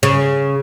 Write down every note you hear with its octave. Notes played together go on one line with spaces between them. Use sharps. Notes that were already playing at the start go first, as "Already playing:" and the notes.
C#3